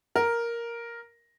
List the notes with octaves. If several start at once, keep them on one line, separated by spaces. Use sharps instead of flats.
A#4